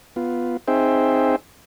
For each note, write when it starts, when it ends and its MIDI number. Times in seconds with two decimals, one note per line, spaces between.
0.16 0.57 59
0.16 0.57 65
0.68 1.36 60
0.68 1.36 63
0.68 1.36 68
0.68 1.36 72
0.68 1.36 76
0.68 1.36 79